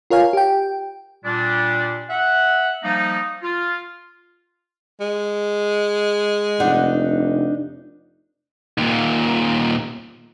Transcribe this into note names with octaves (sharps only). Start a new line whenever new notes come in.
F4 A#4 C#5 F5 G#5
G4 G5
A#2 G3 D4
E5 F#5
F3 G3 A#3 D#4
F4
G#3
F1 D4 D#4 F#5
D#2 A#2